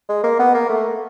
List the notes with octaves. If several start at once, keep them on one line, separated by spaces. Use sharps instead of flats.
G#3
A#3
B3
A#3
A3